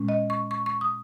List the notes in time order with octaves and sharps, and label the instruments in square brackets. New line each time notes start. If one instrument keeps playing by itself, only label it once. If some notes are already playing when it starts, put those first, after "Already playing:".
Already playing: [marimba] A#2 G#3 C#4
D#5
C#6
C#6
C#6
D#6